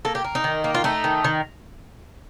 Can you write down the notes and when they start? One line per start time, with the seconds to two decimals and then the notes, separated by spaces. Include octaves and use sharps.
0.05 A#3 A4
0.15 G4
0.24 A#3
0.35 D#4
0.44 D#3
0.64 A#3
0.75 F4
0.84 A3 D#4
1.04 D#3
1.24 D#3